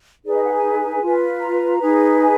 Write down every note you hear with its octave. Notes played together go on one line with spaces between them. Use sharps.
D#4 G#4 B4 D5
D#5
F#5
G#5
F4 B4
A#5
D#4 G#4 B4
G#5